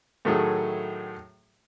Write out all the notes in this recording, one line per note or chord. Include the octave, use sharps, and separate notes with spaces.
A2 D#3 F#3 A3 G#4